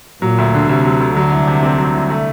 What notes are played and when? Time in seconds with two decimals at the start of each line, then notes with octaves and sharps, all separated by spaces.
0.22 A#2 F#3
0.38 D2
0.54 D3
0.69 D2 C3
0.85 F#3
1.00 D2
1.16 D3 F#3
1.32 C2
1.47 C3
1.63 C4
1.78 F#3
1.94 C2
2.10 A3